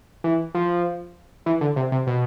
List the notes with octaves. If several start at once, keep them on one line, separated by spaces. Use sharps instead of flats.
E3
F3
E3
D3
C3
C3
B2